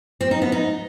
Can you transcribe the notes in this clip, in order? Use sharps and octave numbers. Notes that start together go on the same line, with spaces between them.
C4
D#4
B3
D#4